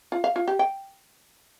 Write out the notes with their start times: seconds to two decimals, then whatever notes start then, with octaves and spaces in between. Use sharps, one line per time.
0.12 F4
0.24 F5
0.36 F4
0.48 G4
0.59 G5